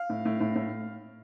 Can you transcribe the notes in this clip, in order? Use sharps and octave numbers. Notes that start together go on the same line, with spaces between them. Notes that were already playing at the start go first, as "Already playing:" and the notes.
Already playing: F5
A2
A2
A2
A2